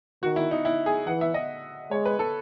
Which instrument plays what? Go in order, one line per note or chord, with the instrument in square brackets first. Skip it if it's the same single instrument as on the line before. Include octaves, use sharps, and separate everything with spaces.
[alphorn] D#3 [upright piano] F#4
[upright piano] E4
D#4
E4
G#4
[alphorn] E3 [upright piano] F#5
[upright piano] E5
D#5
[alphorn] G#3 [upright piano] C#5
[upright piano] B4
A4